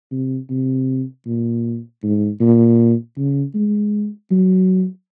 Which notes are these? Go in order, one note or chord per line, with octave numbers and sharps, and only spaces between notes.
C3
C3
A#2
G#2
A#2
C#3
G#3
F#3